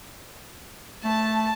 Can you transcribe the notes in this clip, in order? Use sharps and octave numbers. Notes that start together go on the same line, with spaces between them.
A3 A5